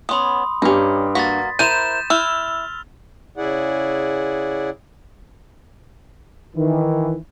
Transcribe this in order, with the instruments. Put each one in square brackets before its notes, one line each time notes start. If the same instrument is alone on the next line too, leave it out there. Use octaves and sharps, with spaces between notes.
[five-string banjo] B3 C#4 [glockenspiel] B5 C6 D#6
[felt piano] G2 G4 [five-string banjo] C#4 D#4
[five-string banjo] A#3 F#4 [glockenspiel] A6 B6
[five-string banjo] E4 A#4 C5 [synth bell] G6 E7 [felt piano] D#7
[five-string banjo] E4 [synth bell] E6 [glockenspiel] F6 F7 G7
[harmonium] C#3 E4 G#4 D5 F#5
[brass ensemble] D#3 E3